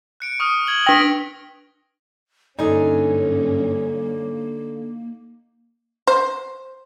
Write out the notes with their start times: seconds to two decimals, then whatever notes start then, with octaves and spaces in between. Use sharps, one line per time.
0.20 F#6 C#7 D7
0.40 C#6 D#6 F6
0.67 G#6 F#7 G7
0.86 D4 G5 A#6 B6 D7
2.59 G2 D3 A#3 C#4 D#4 G#5
6.07 C5